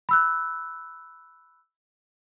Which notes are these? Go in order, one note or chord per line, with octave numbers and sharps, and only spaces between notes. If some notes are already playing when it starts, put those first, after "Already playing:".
B5 E6 F#6